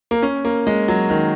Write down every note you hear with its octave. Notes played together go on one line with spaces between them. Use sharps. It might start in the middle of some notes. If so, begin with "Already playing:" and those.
A#3
C#4
A#3
G#3
F#3
D#3